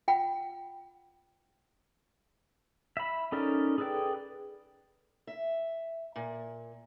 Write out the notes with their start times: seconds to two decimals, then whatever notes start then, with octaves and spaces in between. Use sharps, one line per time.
0.08 F4 F#5 G5 B5
2.97 E5 B5
3.32 C#4 D#4 A4 A#4 D5
3.78 G#4 A4 B4 D5 G5
5.27 E5
6.16 A#2